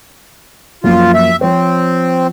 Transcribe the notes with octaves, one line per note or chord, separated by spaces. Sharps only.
F#2 F3 A#3 F4
E5
F3 C4 C#5